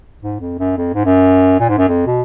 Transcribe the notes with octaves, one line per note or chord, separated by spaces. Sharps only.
G#2
F2
F#2
F2
G#2
F#2
A#2
G#2
F#2
F2
B2